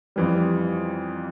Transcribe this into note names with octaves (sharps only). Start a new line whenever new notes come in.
F2 E3 G3